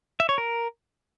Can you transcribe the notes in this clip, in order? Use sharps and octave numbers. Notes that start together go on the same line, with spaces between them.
E5
C#5
A#4